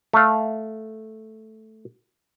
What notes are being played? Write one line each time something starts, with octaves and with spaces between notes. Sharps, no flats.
A3 F5